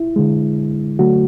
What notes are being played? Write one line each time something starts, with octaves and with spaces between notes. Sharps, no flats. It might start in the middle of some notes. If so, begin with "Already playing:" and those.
Already playing: E4
D3 G#3
D3 F#3 A3 F#4